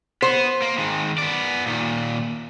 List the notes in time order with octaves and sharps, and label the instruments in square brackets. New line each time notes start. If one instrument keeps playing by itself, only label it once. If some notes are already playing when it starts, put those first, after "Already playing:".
[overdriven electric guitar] B3 [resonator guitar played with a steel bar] C5
[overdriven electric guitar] A#3
D#3 G#3
B3 D5
A#2 D#3